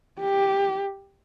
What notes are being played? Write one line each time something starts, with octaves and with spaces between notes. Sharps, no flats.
G4